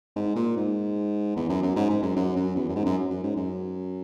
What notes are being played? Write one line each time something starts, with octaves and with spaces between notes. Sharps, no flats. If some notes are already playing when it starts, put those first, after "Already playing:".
G#2
A#2
G#2
E2
F#2
F#2
G#2
G#2
F#2
F#2
F#2
E2
F#2
G#2
F#2
F#2
G#2
F#2